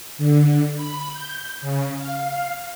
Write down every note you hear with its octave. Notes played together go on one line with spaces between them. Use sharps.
D3
B5
G6
C#3
F5